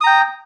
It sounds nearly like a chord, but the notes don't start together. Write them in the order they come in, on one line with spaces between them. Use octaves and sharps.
D#6 A#5 G5